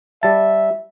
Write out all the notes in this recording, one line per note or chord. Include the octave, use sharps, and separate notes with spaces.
G3 E5 A5